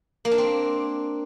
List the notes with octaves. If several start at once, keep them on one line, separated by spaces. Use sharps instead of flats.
A#3
D4
C4